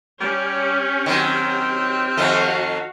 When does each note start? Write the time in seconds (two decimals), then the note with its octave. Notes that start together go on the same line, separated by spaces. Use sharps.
0.21 G3 C#4 G4 G5 F6
1.06 D#3 F#3 C4
2.17 F2 D#3 A3 F#4 F5